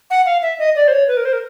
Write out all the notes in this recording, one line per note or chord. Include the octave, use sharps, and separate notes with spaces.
F#5
F5
E5
D#5
D5
C5
C#5
B4
A#4
C5
A#4